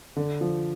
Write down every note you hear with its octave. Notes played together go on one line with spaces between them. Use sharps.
D3
F3